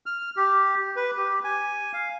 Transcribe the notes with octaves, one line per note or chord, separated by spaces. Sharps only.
F6
G4
B4
G4
G#5
F5